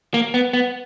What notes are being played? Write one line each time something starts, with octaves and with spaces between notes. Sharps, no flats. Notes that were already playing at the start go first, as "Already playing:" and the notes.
A#3
B3
B3